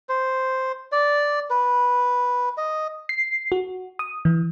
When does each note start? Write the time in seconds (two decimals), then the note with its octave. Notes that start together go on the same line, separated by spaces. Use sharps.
0.09 C5
0.92 D5
1.50 B4
2.57 D#5
3.09 C7
3.52 F#4
3.99 D#6
4.25 E3